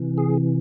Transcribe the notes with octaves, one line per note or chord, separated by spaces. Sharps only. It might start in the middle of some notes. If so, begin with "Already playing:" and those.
Already playing: C3 E3
G#4